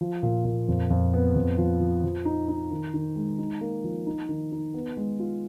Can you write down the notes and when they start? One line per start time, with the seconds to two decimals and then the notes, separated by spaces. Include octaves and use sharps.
0.01 F3
0.23 A#2
0.45 A#2
0.68 F2
0.90 F2
1.14 B3
1.35 F2
1.58 F3
1.80 F3
2.04 F3
2.25 D#4
2.48 D#4
2.71 D#3
2.94 D#3
3.16 G#3
3.39 D#4
3.61 A#3
3.84 F3
4.06 D#4
4.29 D#3
4.52 D#4
4.74 B3
4.97 G#3
5.19 F4